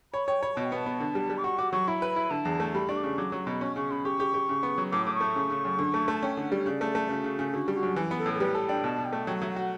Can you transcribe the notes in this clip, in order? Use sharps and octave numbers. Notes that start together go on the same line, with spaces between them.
C#5 B5
C#5 G5
C#5 B5
B2 A5
G5
B3 A5
B3
D3
G3
G3
D6
F#4 C#6
F#4 D6
F#3 C#6
E4 B5
B4
E4
D3 A5
E2
A3
G3 B5
D4 C#6
D6
C#3 C#6
F#3 D6
F#3 C#6
B2 B5
C#4 C#6
C#3 C#6
C#3 B5
G4 C#6
G4
G4
C#3
B3
F#3
A2 D6
A2 D6
C#6
A3
C#3
C#3
F#2
D3
A3
A3
A5
C#4 G5
D3 F#5
G3 D5
C#5
C#3 D5
A3
A3
C#3 F#4
C#3
C#3
D3 F#4
G3
F#4
F#2
E3
B3
A4
A2
A4
G3 B4
A4
D4 G5
B2 A5
B2
G5
A3
F#3 G5
F#5
F#3 E5
F#5
F#4